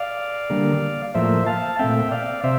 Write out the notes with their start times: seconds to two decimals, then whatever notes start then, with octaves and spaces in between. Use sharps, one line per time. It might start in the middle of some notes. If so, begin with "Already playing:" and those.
Already playing: D5 F5
0.50 D3 G3 A#3
1.14 A2 F3 A#3 C5 E5
1.46 F5 A5
1.79 A#2 A3 C4 E5 G5
2.11 D5 F5
2.44 C3 C5 E5